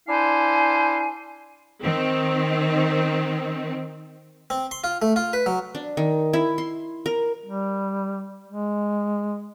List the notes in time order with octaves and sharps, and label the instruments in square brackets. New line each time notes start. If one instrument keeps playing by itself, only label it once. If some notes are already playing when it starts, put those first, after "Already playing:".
[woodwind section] D4 E4 C5 F5 G#5
[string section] D#3 C4
[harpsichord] C4
C6
F4
A3
F4
B4
F#3
[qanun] D4
D#3
E4
C6
A#4
[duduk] G3
G#3